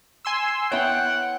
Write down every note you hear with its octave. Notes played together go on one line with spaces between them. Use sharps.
G#5 C6 E6
B3 E4 C#5 F#5 G5